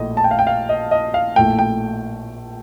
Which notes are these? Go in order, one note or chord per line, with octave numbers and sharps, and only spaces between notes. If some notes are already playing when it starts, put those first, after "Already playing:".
Already playing: A#1 A2 A3 D#5
A5
G5
F5
G5
F5
D#5
D#5
F5
A#1 A2 A3 G5
G5